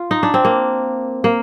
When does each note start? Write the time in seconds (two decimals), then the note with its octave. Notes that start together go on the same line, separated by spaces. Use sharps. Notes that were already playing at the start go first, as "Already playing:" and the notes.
Already playing: F4
0.11 D#4
0.23 D4
0.34 C4
0.45 A#3
1.24 A#3